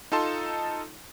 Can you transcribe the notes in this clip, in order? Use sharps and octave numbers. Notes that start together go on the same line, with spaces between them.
D#4 F4 A4 A5 C6